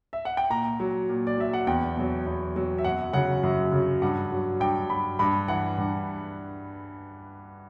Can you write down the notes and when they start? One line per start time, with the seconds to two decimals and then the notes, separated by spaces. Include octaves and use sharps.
0.13 E5
0.25 F#5
0.37 G5
0.50 A#2 A#5
0.80 F#3
1.09 A#2
1.27 D5
1.38 F#3 E5
1.53 F#5
1.67 E2 G5
1.96 B2 F#3
2.26 E2
2.55 B2 F#3
2.78 E5
2.84 F#2 F#5
3.13 C#3 F#3 F#5
3.43 F#2
3.72 C#3 F#3
4.02 G2 F#5
4.32 F#3
4.60 G2 G5
4.90 F#3 B5
5.19 G2 B5
5.48 E3 F#5
5.78 G2